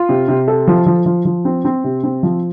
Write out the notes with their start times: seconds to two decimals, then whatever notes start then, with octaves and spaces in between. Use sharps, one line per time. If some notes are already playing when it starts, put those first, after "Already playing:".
Already playing: F4
0.09 C3
0.28 C3
0.48 A4
0.67 F3
0.86 F3
1.06 F3
1.25 F3
1.45 C4
1.65 C4
1.84 C3
2.04 C4
2.23 F3